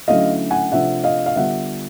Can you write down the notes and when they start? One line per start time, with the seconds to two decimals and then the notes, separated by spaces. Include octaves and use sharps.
0.08 D3 F#3 A3 C#4 E4 D#5 F5
0.50 F#5 G#5
0.72 C3 F3 A3 D4 F4 E5 F#5
1.04 D#5 F5
1.26 F5
1.36 D3 G3 B3 D4 F4 E5 F#5